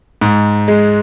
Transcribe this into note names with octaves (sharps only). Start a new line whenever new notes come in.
G#2
G#3